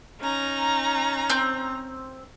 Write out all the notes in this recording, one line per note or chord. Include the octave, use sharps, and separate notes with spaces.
C#4 D#4 A#5
C4 G6